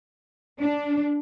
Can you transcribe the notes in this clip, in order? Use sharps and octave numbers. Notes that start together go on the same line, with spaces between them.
D4